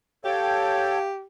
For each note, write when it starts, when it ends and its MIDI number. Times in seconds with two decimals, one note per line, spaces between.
0.25 1.25 67
0.25 0.99 69
0.25 0.99 73
0.25 1.04 77
0.25 0.99 79